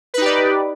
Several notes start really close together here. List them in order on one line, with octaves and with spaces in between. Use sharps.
B4 D#4 G4 D5